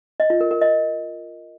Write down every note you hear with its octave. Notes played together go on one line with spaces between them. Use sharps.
D#5
F4
A#4
A#4
D#5